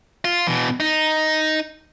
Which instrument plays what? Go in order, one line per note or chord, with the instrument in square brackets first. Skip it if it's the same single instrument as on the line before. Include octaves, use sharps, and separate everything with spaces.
[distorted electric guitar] F4
B2 E3
D#4